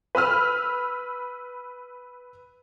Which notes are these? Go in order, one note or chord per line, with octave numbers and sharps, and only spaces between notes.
B4 B5 E6 F6